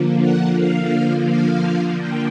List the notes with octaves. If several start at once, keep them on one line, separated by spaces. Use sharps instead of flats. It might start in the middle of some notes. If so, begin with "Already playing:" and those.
Already playing: D3 F3 A#3
F#5
F5
F5
G5